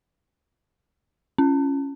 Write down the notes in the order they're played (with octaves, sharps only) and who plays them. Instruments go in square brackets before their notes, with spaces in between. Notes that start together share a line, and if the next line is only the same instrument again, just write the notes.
[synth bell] C#4